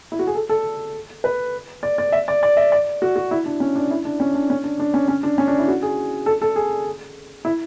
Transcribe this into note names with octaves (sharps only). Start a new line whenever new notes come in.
E4
F#4
G#4
A4
A4
B4
D5
D5
E5
D5
D5
E5
D5
F#4
F#4
E4
D4
C#4
D4
E4
D4
C#4
D4
C#4
D4
D4
C#4
C#4
D4
C#4
D4
E4
F#4
G#4
A4
A4
G#4
E4